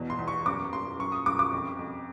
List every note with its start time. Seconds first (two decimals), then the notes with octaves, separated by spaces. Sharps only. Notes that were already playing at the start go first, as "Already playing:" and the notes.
Already playing: E2 B2
0.10 C6
0.19 E2
0.28 C#6
0.46 F#2 D6
0.73 F#2 C6
0.99 F#2 C#6
1.12 D#6
1.26 F#2 D6
1.39 D6
1.53 F2
1.79 F2